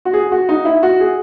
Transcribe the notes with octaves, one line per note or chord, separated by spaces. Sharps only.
F#4
G#4
F#4
D#4
E4
F#4
G#4